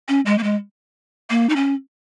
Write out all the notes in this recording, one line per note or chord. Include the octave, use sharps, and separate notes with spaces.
C#4
G#3
A#3
G#3
A#3
D#4
C#4